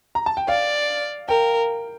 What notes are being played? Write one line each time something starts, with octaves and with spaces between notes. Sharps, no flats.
A#5
A5
G5
D5 F5
A#4 G5